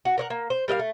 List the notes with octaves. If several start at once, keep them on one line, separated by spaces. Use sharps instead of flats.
F#4
A#4 C#5 F#5
A#3
C5
G3 A#3 D#5 F5
A3